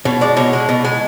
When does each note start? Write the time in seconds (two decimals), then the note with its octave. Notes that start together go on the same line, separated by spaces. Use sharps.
0.05 B2 C#5
0.21 G#3 D5
0.37 B2 C#5
0.53 G#3
0.69 B2
0.85 G#3